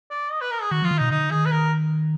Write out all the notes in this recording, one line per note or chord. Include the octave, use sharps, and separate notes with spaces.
D5
D#5
B4
A#4
G#4
D#3 F#4
F3 F4
D#3
B2 D#4
D3 D#4
D#3 G#4
B4
A#4